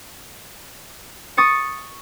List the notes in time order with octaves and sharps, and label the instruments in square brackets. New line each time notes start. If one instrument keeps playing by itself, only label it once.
[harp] C#6 D#6 A6 C#7